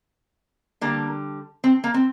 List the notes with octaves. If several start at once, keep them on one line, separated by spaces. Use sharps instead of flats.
D3 G3 A#3
C4
A#3
C4